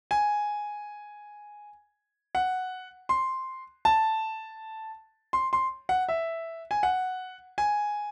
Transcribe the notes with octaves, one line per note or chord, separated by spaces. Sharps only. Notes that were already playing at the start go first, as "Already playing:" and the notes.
G#5
F#5
C6
A5
C6
C6
F#5
E5
G#5
F#5
G#5